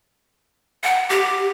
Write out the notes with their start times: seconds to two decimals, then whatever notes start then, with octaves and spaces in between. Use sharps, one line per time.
0.84 F#5
1.09 G4